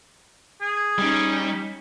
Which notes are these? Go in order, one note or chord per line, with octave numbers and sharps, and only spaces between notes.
G#4
G3 C#4 D#4